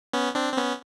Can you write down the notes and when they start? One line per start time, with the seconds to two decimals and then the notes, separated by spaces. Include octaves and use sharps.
0.13 B3 C#4
0.35 C4 D4
0.53 C4
0.57 B3 C#4